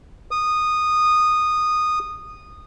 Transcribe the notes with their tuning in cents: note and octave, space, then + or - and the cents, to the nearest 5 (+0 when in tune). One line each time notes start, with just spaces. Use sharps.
D#6 -15